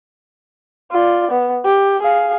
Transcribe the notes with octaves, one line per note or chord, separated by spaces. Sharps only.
F4 D5
B3
G4
G#4 F5